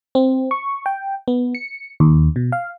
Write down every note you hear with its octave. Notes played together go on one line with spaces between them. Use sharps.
C4
C#6
G5
B3
C#7
D#2
B2
F5